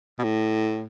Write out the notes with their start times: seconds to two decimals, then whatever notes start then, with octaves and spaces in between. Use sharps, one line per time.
0.19 B2
0.23 A2